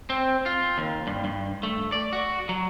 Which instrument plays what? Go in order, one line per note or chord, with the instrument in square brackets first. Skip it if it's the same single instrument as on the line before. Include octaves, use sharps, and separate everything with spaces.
[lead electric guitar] C4
F4
D#2
G2
G2
A3
D5
F#4
F#3